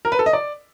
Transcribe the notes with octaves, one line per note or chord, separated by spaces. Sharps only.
A#4
B4
A4
D#5
D5